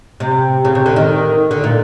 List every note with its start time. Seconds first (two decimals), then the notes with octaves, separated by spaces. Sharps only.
0.20 C3
0.65 C#3
0.75 C3
0.86 D3
0.96 D#3
1.51 D3
1.64 A#2